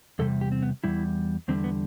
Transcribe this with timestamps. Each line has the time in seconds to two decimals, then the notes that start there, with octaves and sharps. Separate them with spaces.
0.19 E2 C3 G3 A4
0.41 G4
0.52 C4
0.62 B3
0.84 E2 C3 G3 E4
1.48 E2 D3 G3 C4
1.64 B3